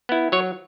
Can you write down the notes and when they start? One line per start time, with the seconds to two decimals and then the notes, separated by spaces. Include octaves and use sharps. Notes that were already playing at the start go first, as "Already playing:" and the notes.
0.09 B3 E4
0.32 F#3 C#5